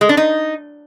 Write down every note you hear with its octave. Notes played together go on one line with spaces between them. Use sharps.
G#3
D4
D#4